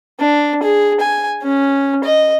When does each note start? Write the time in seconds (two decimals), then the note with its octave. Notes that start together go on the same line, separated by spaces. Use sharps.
0.19 D4
0.63 G#4
1.00 G#5
1.43 C#4
2.04 D#5